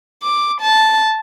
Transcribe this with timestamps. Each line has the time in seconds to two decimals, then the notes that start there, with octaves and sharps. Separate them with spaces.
0.23 D6
0.61 A5